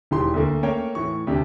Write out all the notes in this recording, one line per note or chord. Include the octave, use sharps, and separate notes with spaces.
E1 D#3 E3 G4 C6
D2 D3 A3 A#3
A3 A#3 C#4 A#4 C#5 G5
A2 E3 C#6
D2 C3 D4 G4